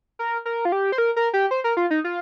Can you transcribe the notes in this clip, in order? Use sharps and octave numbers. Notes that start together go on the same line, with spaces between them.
A#4
A#4
F4
G4
C5
A#4
A#4
G4
C5
A#4
F4
D#4
F4